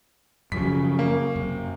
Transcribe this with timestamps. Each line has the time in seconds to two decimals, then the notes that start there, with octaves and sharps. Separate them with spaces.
0.52 F#2 C#3 F3 F#3 B6
0.99 A#3
1.36 F#2 C3